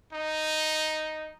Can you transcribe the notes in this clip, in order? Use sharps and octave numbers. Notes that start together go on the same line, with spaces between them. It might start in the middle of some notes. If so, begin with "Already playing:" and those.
D#4